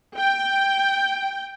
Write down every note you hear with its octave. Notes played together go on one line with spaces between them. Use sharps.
G5